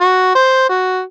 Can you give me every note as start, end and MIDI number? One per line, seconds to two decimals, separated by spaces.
0.01 0.33 66
0.35 0.66 72
0.69 1.01 66